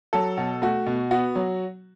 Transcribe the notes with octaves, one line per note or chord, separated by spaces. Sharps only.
F#3 A4
B2
A3 F#4
B2
B3 F#4
F#3